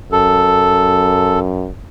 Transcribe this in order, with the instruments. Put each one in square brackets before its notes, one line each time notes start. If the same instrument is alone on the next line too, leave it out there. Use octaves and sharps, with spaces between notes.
[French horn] F#2 [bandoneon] A4